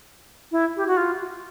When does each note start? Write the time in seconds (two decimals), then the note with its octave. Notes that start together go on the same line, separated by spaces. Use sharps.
0.52 E4
0.77 G4
0.87 F#4
0.97 F4